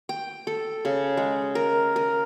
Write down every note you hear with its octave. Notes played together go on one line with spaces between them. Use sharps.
G5
A4
C#3
G#3
A#4
A#4